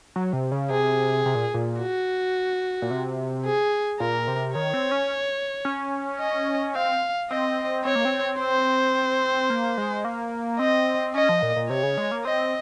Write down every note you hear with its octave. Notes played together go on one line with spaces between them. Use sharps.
F#3
C3
C#3
C3 G#4
C3
A#2
A#2
F#4
A#2
C3
G#4
A#2 A#4
C3
D#3 C#5
C4
C#4
C#4
D#5
C4 F5
C4 D#5
C4 C#5
A#3
C4
C5
A#3
G#3
A#3
C4 D#5
C#4 D#5
F3
A#2
A#2
C3 C#5
C#3
G#3
A#3
C4 D#5